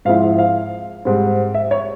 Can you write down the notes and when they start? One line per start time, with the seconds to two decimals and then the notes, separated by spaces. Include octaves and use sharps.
0.05 G#2 F3 C4 E4 F5
0.39 F5
1.05 G#2 G3 C4
1.54 E5
1.71 C#5